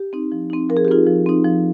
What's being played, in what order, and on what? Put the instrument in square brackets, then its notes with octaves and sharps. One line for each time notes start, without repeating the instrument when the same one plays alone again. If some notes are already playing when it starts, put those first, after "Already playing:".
Already playing: [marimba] G4
C4 D#4
F3
C4 D#4
F3 A#4
G#4
G4
C4 D#4 F4 G#4
F3
C4 D#4
F3